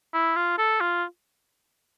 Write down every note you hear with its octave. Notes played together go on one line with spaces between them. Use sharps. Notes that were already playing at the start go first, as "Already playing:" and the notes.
E4
F4
A4
F4